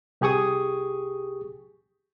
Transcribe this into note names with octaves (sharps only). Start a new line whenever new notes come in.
C2 G4 G#4 C#6 D#6